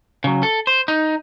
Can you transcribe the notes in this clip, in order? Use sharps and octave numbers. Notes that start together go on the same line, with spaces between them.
C#3 F#3
A4
C5
D#4